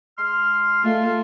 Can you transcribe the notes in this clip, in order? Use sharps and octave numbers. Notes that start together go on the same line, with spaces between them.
G#3 C6 F6
A3 F4